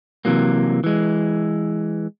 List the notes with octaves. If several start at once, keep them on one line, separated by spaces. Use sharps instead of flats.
C3 E3 F#3 A#3
E3 G#3